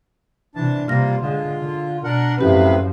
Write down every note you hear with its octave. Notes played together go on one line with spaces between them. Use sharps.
C3 E3 D4 A5
C3 G3 A#3 F4 F6 A#6
D3 G#3 F4
D3
B2 D4 A#4 F#5
F#2 A2 C3 F3 C#4 G4 B4